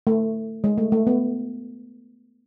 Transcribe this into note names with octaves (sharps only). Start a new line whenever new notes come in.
A3
G#3
A3
A3
B3